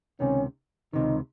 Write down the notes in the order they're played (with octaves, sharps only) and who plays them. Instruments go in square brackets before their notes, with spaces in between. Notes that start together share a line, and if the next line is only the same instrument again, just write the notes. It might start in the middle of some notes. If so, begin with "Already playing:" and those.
[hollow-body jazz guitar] C#2 C3 D#3 [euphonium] C#4
[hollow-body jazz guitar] C#2 C3 D#3 [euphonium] D#4